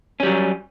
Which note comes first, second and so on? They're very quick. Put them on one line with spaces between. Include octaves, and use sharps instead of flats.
C#4 G3 F#3